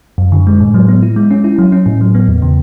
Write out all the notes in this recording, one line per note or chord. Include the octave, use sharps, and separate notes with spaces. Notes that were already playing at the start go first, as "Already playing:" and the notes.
F#2
D3
G#3
A2
F#3
B3
E4
G#3
C#4
E4
F#3
C#4
A2
F#3
B3
E2
C#3